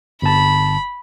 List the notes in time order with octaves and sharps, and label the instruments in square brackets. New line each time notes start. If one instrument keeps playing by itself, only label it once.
[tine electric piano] G1 A5 [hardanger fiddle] B5